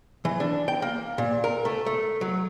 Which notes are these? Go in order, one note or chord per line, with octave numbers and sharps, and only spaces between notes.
E3
D4
G5
A#3
A#2
A#4
A3
A3
F#3